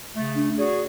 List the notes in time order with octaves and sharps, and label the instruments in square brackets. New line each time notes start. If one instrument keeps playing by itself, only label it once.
[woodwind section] C#3 A3
[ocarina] D4
[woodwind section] F#4 G#4 [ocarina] D5